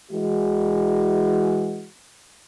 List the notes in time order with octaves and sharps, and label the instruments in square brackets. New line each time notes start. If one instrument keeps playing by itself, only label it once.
[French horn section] E3 G#3 F#4